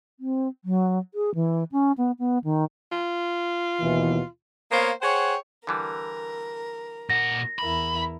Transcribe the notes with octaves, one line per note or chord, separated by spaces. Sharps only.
C4
F#3
G#4
E3
C#4
B3
B3
D#3
F4
D#2 B2 E3
A#3 B3 C5 C#5 F5
G#4 C5 C#5 F#5 G5
D3 E3 G3 A#4
A#2 F#5 A#6
E2 E4 A#4 B5